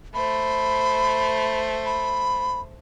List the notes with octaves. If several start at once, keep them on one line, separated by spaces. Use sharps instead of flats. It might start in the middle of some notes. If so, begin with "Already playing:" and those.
A3 C5 B5
B5